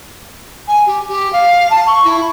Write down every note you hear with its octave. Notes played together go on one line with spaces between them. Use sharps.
G#5
G4
G4
F5
A5
C#6
E4